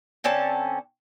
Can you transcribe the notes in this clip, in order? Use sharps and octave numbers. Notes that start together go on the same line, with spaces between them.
D3 C4 C#4 A5